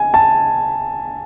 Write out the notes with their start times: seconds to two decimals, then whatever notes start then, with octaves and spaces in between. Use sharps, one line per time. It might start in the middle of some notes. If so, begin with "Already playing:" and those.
Already playing: G#5
0.14 A5